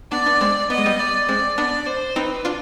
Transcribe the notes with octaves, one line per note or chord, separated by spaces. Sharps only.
B3 D4 D5
B3 D4
G#3 C4
B3 D#5
G#3
G3 B3
D5
G#3 C4 D5
B3 D4 D5
C5
C4 D#4 B4
D4 F4